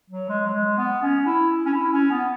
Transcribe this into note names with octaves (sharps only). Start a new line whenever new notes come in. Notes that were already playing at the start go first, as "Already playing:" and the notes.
F#3
G#3
F#3
G#3
B3
C#4
E4
C#4
E4
C#4
B3